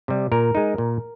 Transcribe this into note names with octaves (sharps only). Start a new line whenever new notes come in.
C3 G3
A#2 A#4
G#3 D#4
A#2